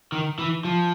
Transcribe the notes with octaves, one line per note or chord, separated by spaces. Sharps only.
D#3
E3
F3